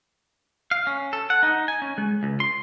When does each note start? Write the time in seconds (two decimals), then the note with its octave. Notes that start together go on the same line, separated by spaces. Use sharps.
0.71 F5
0.87 C#4
1.13 A4
1.30 F#5
1.43 D#4
1.68 G#5
1.82 C#4
1.98 G#3
2.23 C#2
2.40 C6